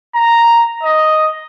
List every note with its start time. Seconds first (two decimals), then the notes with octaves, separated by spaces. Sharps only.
0.15 A#5
0.83 D#5